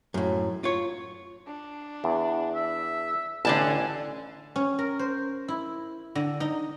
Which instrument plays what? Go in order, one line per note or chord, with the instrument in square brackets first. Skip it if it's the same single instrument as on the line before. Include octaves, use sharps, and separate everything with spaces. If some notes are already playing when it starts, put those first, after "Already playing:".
[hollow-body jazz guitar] F#2 A2
F4 C#5
[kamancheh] D4
[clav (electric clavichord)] E2
[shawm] E5
[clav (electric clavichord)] A1 [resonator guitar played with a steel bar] D3 D5 A5 [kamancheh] G#5
[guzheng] C#4
A#4
C5
E4
D3
D#4